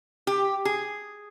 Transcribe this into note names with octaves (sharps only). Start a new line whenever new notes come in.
G4
G#4